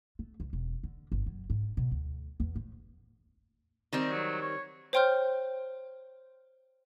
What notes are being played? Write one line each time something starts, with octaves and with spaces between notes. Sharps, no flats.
A3
C#2
E1
D3
G1
F#2
G#2
B2
D2
E2
A2
D#3 G3 C4
F#3
C#5
C5 C#5 G5 C6 F6 G6